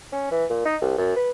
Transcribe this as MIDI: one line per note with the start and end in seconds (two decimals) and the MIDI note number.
0.12 0.30 61
0.31 0.45 52
0.50 0.61 46
0.65 0.76 63
0.81 0.93 36
0.98 1.16 42
1.16 1.31 71